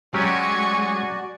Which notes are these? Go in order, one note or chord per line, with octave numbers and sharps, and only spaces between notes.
F#3 G#3 C#4 F#4 G4 D5 G#5 C#6